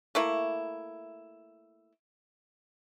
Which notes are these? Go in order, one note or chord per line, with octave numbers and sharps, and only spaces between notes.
A3 A#3 E4